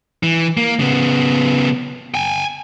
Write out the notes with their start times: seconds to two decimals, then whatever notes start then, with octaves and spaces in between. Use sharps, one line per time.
0.23 E3
0.57 A#3
0.80 C#3 B3
2.14 G5 G#5